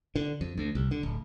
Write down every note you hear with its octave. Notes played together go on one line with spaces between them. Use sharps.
D3
F2
D2
C2
D3
D1